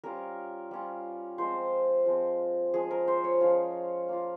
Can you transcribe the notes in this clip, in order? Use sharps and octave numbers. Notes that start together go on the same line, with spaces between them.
G3 C#4 F4 A#4
G3 C#4 F4
F3 G#3 C4 C5
F3 G#3 C4
F3 G#3 C#4 F4 G#4
A#4
C5
C#5
F3 G#3 C#4 F4
A#3 F4